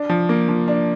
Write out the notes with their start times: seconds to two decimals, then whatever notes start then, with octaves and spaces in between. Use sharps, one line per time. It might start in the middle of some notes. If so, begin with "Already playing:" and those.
Already playing: D4
0.09 F3
0.29 A#3
0.49 F3
0.68 D4